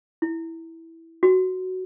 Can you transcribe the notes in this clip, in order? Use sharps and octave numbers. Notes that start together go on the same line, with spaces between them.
E4
F#4